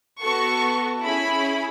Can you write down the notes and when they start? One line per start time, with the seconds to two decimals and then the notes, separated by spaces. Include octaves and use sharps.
0.22 B3 F#4 A4 C#6
1.04 C#4 E4 G#4 B5